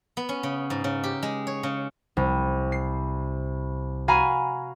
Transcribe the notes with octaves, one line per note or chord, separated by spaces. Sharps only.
B3
C#4
C#3
G#2
C#3
G4
G#3
C#5
C#3
C2
C7
F#4 F5 G#5 A#5 B5